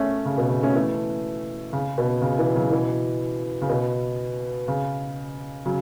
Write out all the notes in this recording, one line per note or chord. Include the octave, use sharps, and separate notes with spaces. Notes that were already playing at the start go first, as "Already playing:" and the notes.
Already playing: A3 C#4
C#3
B2
C#3
A3 C#4
E3 A3
C#3
B2
C#3
B2 E3
C#3 F#3
B2 E3
C#3
B2
C#3
C#3 F#3